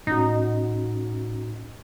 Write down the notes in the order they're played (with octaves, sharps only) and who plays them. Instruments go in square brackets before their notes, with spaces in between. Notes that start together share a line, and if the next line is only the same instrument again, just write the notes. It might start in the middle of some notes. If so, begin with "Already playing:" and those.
[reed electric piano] A2 C#4 F#4 [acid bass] D#4